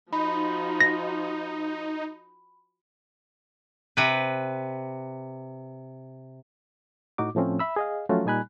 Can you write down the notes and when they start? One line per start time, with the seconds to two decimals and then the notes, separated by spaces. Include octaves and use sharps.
0.13 F3 D#4 F#4 B5
0.81 A#6
3.97 C3 B4
7.18 A2 D#4 F#4 D6
7.35 A2 F3 A3 C4 C#4
7.59 E5 B5 E6
7.76 G#4 D#5 F5
8.09 F3 F#3 A3 C#4 F4 F#4
8.26 A#2 G3 D#4 G#5 B5 F#6